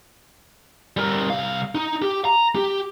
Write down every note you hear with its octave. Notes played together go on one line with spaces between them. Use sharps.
G3 A#4
C2 F5
D#4
G4
A#5
G4